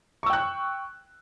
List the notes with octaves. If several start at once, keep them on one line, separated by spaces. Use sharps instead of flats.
G5 C#6 E6 F#6